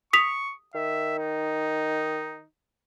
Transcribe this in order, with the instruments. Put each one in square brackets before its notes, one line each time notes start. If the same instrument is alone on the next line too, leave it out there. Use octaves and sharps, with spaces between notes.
[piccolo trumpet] C#6 [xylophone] D#6 B6 F7
[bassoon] D#3 [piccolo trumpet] E5
[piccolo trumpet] D#4